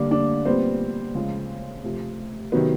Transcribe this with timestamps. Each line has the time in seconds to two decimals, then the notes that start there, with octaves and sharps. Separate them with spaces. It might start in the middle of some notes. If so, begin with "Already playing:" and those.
Already playing: D3 G3 A#3 D4
0.11 D4
0.45 A#2 G3 B3 C4
1.15 C#3 F3 G#3
1.83 C3 F3 A3
2.52 C3 D#3 F#3 B3